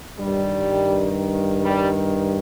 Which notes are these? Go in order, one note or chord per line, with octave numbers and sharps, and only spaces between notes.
G2 D#3 G3
G3